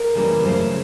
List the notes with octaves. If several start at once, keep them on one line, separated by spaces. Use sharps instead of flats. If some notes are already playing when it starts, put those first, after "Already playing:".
Already playing: A#4
C#3 E3 G3 A#3
C#3 F#3 A3 C#4 C5